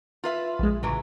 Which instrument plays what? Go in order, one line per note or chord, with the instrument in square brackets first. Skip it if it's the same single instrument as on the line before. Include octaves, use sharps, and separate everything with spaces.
[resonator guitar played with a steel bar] F4 B4 E5
[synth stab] A#1 G#3
[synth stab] A1 C#3 [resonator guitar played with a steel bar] E3 F#3 B4